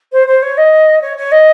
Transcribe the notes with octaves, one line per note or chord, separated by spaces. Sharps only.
C5
C5
C#5
D#5
C#5
C#5
D#5